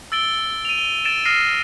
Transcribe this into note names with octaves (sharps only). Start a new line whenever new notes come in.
E6 A6 D7 G7
D#7 F7
G7
A6 D7 E7
D#6 F6 A#6 C7 D#7